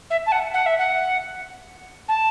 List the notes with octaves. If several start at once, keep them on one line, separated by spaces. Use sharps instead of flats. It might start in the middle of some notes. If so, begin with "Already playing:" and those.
E5
A5
F#5
F#5
E5
F#5
A5